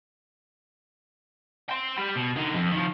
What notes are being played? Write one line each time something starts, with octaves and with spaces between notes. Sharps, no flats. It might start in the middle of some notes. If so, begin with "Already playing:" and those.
G5 C6
G4 B5
B2
D3 D#4
F2
D#3 F3